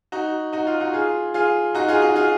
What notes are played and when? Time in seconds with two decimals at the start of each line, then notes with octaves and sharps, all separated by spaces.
0.12 D#4 F#4
0.53 D#4 F#4
0.67 F4
0.80 D#4 F#4
0.93 F4 G#4
1.34 F4 G#4
1.75 D#4 F#4
1.88 F4 G#4
2.02 D#4 F#4
2.16 F4 G#4